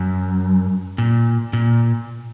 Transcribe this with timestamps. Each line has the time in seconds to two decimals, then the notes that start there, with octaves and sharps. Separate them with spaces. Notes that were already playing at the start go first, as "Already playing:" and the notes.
Already playing: F#2
0.98 A#2
1.53 A#2